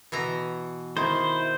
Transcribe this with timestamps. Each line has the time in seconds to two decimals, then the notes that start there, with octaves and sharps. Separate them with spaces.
0.12 B2 E3 A#5
0.97 D#3 E4 C5